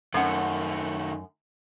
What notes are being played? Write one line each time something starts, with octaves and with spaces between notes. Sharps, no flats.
F#2 D#3 A3 F#5